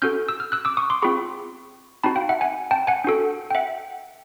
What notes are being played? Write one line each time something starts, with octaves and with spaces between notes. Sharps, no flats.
C#4 F#4 A4 F6 G6
E6
F6
E6 F#6
D6 E6
C#6 D#6
C6 D6
C4 F4 G#4 B5 C#6
C4 D#4 F#4 A5 B5
F5 G5
E5 F#5
F#5 G#5
G5 A5
F#5 G#5
D4 F#4 A4
G5
E5 F#5